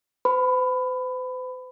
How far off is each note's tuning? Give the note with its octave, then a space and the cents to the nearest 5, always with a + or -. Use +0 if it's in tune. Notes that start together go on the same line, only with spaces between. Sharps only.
C5 -45 B5 +20